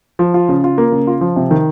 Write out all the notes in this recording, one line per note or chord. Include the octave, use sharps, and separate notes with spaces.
F3
F4
C#3
F4
A#3
C#3
F4
F3
C3
D#3